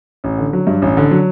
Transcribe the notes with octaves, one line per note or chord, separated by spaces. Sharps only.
A1
D3
F#3
G2
A1
D3
F#3